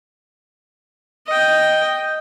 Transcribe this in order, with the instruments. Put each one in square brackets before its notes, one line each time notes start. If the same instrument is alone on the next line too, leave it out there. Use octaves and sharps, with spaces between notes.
[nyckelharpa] D#5 G5